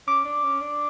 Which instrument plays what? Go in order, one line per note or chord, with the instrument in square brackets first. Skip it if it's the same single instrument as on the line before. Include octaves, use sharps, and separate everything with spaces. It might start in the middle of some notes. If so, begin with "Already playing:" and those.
[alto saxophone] C#4 [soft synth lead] D6
[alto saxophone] D4
C#4
D4